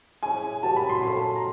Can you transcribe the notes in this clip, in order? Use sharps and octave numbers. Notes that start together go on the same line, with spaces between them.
G#3 C#4 E4 G#5
F#3 A#3 D4 G4 A5
B5
C6
C#4 F4 A4 C6
A#5